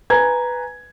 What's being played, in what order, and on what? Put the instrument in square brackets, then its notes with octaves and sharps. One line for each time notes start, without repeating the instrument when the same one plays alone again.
[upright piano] B4 G#5 A#5 G#6